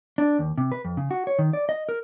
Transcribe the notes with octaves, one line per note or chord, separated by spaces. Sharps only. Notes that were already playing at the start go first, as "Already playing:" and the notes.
D4
D#2
C3
B4
F2
C#3
F#4
C#5
D#3
D5
D#5
A#4